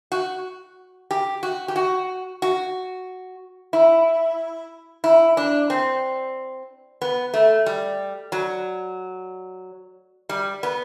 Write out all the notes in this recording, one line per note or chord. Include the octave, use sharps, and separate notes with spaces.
F#4
G4
F#4
G4
F#4
F#4
E4
E4
D4
C4
B3
A3
G3
F#3
G3
B3